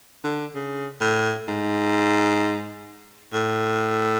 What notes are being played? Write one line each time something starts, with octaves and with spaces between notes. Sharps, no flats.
D3
C#3
A2
G#2
A2